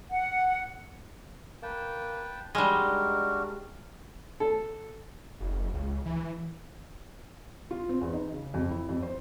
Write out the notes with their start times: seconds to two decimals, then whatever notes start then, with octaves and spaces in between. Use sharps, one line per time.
0.11 F#5
1.63 A#3 B4 G5 A5
2.55 G3 G#3 D4 D#4 F#4 A#4
4.40 A4
5.40 F#1
5.74 C#2
6.05 E3
7.71 F4
7.89 C4
8.01 E2
8.13 D#4
8.32 C#3
8.54 F2
8.71 E4
8.89 F2
9.03 C5